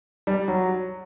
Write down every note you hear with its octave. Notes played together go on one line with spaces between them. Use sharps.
G3
F#3